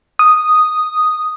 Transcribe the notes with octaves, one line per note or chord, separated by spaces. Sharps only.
D#6